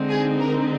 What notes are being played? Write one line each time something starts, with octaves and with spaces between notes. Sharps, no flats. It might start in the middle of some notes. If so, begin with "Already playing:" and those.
Already playing: D3 G#3 C4 D#4
G#4
A#4